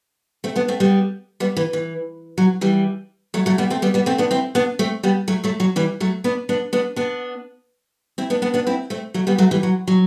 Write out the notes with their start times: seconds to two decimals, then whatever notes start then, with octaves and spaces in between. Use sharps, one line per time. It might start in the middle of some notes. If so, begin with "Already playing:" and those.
0.44 A3 C4
0.56 B3 D4
0.68 A3 C4
0.80 G3 B3
1.40 G3 B3
1.57 E3
1.73 E3
2.38 F#3
2.61 E3 G3
3.34 F#3 A3
3.46 F#3 A3
3.58 G3 B3
3.70 A3 C4
3.82 G3 B3
3.94 G3 B3
4.06 A3 C4
4.18 B3 D4
4.31 C4 E4
4.55 B3 D4
4.79 A3 C4
5.03 G3 B3
5.28 F#3 A3
5.44 F#3 A3
5.60 F#3
5.76 E3 G3
6.00 F#3 A3
6.24 B3 D4
6.49 B3 D4
6.73 B3 D4
6.96 B3 D4
8.18 C4 E4
8.30 B3 D4
8.42 B3 D4
8.54 B3 D4
8.67 C4 E4
8.90 A3 C4
9.14 F#3 A3
9.27 G3 B3
9.38 F#3 A3
9.51 E3 G3
9.63 F#3
9.87 F#3